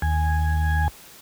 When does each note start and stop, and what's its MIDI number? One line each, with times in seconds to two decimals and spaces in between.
0.02 0.88 39
0.02 0.88 80